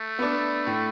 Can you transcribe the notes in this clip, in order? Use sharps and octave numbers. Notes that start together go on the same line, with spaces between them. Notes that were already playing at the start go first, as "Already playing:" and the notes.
Already playing: A3
B3 D4
A2